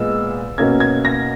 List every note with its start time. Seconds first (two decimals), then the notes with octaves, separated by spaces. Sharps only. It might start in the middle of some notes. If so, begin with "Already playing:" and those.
Already playing: A#2 G#3 B3 E6
0.58 B2 A#3 C#4 G#6
0.80 G#6
1.05 A#6